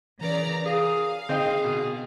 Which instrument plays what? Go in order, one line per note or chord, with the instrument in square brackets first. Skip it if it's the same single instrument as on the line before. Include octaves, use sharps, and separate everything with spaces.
[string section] C#3 D5 A#5 [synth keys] E3 A#4 B4
[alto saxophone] G#4 [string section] F5
[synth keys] D3 D#4 [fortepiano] C4 D#5 G5 [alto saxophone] G#4
[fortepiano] B2